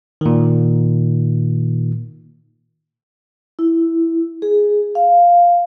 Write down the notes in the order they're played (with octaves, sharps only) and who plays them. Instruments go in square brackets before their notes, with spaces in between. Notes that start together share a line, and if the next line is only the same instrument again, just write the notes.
[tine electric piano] A#2 D#3
[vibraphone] E4
G#4
F5